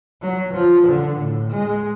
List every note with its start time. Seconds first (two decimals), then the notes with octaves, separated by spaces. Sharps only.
0.22 F#3
0.54 F3
0.87 D3
1.20 A2
1.53 G#3